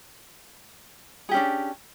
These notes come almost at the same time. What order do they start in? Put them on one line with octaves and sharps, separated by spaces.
G#4 G4 C#4 D4